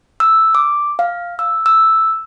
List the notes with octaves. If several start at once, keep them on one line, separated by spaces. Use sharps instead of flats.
E6
D6
F5
E6
E6